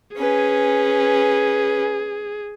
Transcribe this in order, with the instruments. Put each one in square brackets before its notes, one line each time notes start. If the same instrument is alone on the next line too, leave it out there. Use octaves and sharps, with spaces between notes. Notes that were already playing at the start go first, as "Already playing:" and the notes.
[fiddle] C#4 B4 [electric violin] G#4